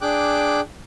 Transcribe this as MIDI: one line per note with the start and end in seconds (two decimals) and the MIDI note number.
0.01 0.61 62
0.01 0.61 68
0.01 0.61 79
0.01 0.61 86
0.01 0.61 90